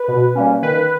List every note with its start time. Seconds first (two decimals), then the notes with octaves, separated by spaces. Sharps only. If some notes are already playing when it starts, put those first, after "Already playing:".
Already playing: B4
0.08 B2
0.35 G3 A#3 C#4
0.62 D#3 B4